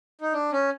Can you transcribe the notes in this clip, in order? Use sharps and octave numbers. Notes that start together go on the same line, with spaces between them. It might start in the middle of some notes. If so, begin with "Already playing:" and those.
D#4
D4
C#4